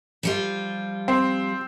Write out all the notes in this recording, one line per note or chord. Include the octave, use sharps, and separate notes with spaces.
F3 G3 F4
C4